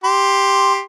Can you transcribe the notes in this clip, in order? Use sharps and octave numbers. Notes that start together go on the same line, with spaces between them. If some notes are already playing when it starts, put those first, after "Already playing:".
G4 C6